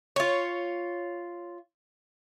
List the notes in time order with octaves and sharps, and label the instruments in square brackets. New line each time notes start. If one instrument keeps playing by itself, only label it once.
[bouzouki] F4 C#5